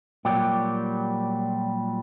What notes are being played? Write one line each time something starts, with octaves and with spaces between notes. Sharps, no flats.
A#2 F#3 G3 G4